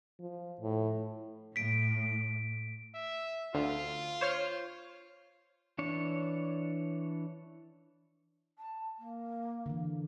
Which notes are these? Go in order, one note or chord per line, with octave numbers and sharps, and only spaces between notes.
F3
A2
A2 B6 D7
E5
D2 F4
C5 C#5 F6
E3 D4 C#5
A5
A#3
D3 E3